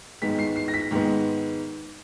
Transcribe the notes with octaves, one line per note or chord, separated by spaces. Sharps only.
G#2 D#3 G#3 B3 B6
C7
C7
A#6
B6
G#2 D#3 G#3 B3